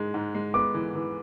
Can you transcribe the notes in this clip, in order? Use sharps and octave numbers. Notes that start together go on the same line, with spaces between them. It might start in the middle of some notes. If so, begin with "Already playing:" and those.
Already playing: G#2 G#3
G#2
G#3
B3 D6
E3
E3